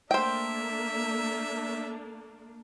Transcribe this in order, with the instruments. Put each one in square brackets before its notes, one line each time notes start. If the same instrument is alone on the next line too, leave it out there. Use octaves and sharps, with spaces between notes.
[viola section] A3 A#3 D4 [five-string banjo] C5 G5 [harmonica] E5